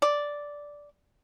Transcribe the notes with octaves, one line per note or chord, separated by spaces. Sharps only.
D5